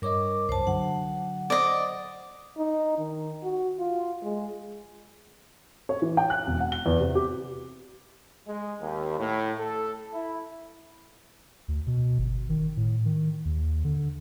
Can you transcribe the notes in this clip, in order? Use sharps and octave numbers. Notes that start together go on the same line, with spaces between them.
G2 A#4 C#5 D#5 D6
C2 F#2 C5 A5
D3 F#3 F#5
C5 D5 D#5
D#4
D#3
F#4
F4
G#3
C#5
E3
G5
F#6
E1
F#5
G7
E2
C3
G4
G#3
D#2
A2
A4
E4
D2
B2
G1
D#3
A2
D#3
D#2
D3